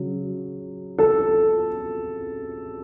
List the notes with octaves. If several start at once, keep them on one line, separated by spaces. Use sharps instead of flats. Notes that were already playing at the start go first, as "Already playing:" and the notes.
Already playing: C#3 F#3
A4